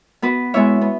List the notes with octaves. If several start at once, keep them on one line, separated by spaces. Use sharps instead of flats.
B3 F#4 B4
G#3 B3 E4 C#5 E5
B3